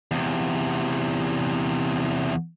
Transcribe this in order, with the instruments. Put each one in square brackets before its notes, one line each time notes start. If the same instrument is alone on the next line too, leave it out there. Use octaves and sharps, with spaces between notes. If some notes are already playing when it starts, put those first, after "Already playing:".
[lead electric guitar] E2 C3